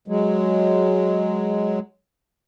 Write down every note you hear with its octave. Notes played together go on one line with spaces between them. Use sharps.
F#3 G#3